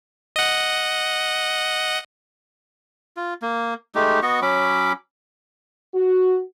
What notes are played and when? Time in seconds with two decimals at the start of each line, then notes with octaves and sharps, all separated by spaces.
0.36 D#5 F#5
3.17 F4
3.42 A#3
3.95 G#3 A3 D#4 G4
4.22 B3 F#4 D#5 C#6
4.42 F#3 C#4 B5 D6
5.95 F#4